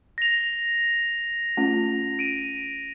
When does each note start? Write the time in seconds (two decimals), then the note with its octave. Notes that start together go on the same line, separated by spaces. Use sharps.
0.18 A#6 F7
1.57 A3 C#4 F4
2.19 D7 D#7